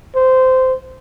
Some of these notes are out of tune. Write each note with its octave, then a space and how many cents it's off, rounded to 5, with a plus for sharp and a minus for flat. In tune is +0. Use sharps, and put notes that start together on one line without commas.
C5 -15